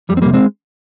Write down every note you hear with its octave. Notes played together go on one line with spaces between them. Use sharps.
F2 G3
C4
C3 G3 A#3
G#3 C4